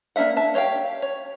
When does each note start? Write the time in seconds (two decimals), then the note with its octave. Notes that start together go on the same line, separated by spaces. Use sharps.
0.16 A#3 C#4 D4 E5 F#5
0.37 E5 A5
0.54 G4 C#5 D#5 F5 G5
1.02 C#5